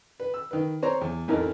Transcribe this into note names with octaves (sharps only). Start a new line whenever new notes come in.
B4
E6
D#3 B4
C4 C5 C#5 A#5
E2
A1 F2 D#4 E4 A#4